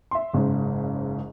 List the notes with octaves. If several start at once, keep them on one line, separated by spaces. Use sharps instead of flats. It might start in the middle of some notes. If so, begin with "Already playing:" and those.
E5 C6
F#1 G#2 C#3